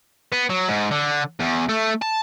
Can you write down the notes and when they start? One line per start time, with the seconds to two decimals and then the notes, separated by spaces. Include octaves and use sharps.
0.32 B3
0.50 F#3
0.69 G#2
0.91 D3
1.39 E2
1.69 A3
2.02 A5